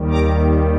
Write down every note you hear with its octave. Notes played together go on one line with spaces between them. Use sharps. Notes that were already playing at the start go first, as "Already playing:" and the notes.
Already playing: D#2 D#3 G3
A#5 D6